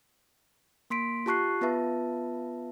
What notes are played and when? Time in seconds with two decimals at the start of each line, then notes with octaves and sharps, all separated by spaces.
0.90 A#3 C6 B6 D7
1.26 F4 G4 A5 C#6 F#6 C7
1.61 B3 F4 B4 E5 A5